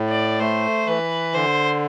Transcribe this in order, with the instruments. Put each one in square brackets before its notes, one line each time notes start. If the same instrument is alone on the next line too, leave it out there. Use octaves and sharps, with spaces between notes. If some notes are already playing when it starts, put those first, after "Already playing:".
Already playing: [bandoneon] A2
[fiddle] D5
[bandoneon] A3 [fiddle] C5
[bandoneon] E3 [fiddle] B4
[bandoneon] D3 [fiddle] C5